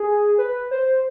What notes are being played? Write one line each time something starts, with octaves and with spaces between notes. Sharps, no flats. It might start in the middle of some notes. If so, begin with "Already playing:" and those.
Already playing: G#4
B4
C5